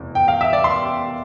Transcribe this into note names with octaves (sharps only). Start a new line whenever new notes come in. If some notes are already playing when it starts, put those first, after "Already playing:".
Already playing: F1 E2 B2
G5
F5
E5
D5
C6